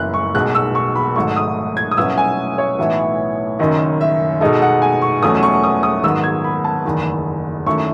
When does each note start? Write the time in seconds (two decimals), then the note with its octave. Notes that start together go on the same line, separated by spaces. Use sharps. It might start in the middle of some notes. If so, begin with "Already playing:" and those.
Already playing: F#1 F#2 E3 F#6
0.14 C#6
0.34 B1 B2 G#3 F#6
0.55 E6
0.75 C#6
0.96 B5
1.16 G#1 G#2 F#3 A3 C#6
1.36 D#6
1.77 G#6
1.91 D#6
1.97 B2 F#3 C#4 E4 B4 E6
2.18 G#5
2.58 C#5
2.79 B1 A2 E3 B3 E4
3.59 F#1 F#2 D#3 D#5
4.01 E5
4.41 B2 G#3 D#4 A4 D#5
4.62 F#5
4.82 G#5
5.02 C#6
5.22 E2 B2 F#3 A3 C#4 D#6
5.43 C#6
5.64 D#6
5.83 D#6
6.04 G#2 D#3 F#3 B3 E6
6.24 G#6
6.44 B5
6.64 A5
6.85 F#1 E2 D#3
7.66 F#2 D#3 A3 E4 C#6